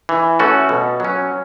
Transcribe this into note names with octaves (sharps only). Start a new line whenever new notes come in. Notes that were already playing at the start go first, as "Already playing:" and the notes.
E3
A3 C#4 F#4 A4
B2
F#3 C#4